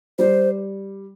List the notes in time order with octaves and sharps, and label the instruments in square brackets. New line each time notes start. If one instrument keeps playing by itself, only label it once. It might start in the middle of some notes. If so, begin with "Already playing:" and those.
[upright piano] G3 [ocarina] C5